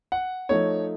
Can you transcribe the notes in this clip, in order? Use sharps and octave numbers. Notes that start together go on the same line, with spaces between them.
F#5
F3 A3 D#4 C#5